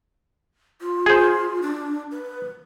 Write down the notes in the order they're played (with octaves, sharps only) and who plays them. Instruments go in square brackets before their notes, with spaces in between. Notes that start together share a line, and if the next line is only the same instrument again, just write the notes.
[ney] F4
[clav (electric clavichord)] G#4 C5
[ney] D4
B4